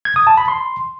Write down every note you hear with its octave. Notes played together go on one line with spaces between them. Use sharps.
G#6
D#6
A5
B5
C6